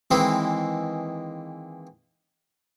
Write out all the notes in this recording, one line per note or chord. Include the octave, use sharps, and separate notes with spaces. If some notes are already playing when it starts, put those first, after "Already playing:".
D#3 E3 G#3 A#3 C4 E4